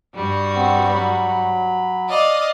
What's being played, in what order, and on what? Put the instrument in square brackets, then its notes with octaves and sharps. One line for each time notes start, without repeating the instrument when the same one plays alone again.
[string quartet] G2 G3 F#4
[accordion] B3 C4
F#3 B5
[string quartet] D5 D#5 F5